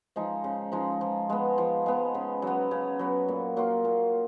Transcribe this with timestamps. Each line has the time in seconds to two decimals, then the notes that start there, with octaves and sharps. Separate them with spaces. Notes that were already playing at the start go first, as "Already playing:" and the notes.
0.16 F3 G#3 D#4
0.44 C#3
0.72 F3 G#3 D#4
1.01 F3
1.30 G#3 B3
1.58 F3
1.86 G#3 B3
2.15 C#3
2.42 F#3 B3
2.71 C#3
2.99 F#3 B3
3.28 A#2
3.57 F#3 A#3 F4
3.85 A#2